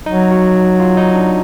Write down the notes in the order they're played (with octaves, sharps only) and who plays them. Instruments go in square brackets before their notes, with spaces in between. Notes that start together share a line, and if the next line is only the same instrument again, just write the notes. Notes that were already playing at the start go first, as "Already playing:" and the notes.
[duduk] F#3 [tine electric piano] D#4
[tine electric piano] F#4
F4
D#4
D4